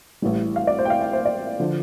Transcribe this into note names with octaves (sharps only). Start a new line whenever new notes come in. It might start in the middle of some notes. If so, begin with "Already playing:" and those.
A1 A2 G3
F5
D5
C5
G5
F5
G5
C5
D5
D3 F3